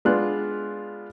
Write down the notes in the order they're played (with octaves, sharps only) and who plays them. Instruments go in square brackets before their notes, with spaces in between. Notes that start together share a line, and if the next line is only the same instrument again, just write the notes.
[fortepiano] G#3 B3 D4 F4 F#6